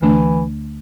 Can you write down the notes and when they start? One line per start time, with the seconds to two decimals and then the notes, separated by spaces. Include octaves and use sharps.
0.01 D2 D3 E3 A3 D4